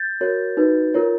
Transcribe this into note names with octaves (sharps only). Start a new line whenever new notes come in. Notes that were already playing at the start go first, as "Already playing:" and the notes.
Already playing: G6 A6
F#4 A#4 C#5
D#4 F#4 B4
F4 A#4 C#5